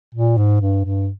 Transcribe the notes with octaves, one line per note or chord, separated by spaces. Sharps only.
A#2
G#2
G2
G2